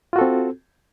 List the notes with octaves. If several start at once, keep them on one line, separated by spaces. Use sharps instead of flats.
C4 F4 F#4 A4